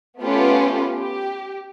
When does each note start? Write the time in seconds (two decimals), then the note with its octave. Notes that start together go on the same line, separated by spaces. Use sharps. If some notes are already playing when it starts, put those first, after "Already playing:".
0.21 A3 B3 C#4 F4 G4 B4
0.98 G4